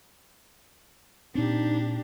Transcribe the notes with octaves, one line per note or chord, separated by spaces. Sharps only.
A#2 C4 D4 D#4 G4